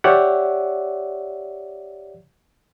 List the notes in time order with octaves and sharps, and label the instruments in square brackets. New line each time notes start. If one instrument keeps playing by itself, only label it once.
[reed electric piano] G4 C#5 D5 E5 F#5